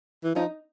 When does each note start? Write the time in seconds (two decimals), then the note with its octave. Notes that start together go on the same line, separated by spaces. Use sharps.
0.24 E3
0.35 F3 D#4